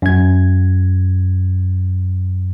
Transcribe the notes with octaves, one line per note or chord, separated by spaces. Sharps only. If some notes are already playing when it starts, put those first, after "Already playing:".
F#2 G#6